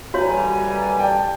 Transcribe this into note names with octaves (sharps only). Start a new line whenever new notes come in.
A1 D#2 G3 F#4 B4 C#5 G#5 A#5
D5 G5 A5